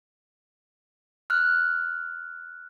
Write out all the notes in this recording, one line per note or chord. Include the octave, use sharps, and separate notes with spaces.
F6 F#6